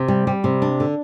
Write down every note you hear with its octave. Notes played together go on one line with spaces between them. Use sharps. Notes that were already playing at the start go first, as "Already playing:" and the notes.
Already playing: C3
G3
G3
C3
D4
D3